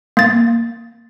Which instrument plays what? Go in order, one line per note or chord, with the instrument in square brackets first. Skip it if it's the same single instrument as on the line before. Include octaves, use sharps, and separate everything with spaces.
[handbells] A#3 A6